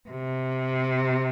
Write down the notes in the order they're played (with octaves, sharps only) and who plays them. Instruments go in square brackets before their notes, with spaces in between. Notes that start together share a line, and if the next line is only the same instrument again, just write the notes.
[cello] C3